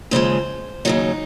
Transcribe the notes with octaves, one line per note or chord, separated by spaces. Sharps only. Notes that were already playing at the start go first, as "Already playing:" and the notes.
D#2 C#3 F3 G#3 C5
D#2 C#3 F#3 D#4